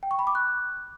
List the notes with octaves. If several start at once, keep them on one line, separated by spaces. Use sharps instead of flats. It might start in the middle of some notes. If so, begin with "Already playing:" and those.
G5
C#6
B5
D6
F#6